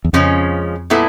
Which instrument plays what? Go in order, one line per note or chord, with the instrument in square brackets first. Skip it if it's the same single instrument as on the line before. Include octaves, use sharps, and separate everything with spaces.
[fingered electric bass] E2
[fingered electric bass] F2 [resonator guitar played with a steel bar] C#3 F3 G#3 C#4
[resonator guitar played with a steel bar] A#2 G3 B3 E4 A4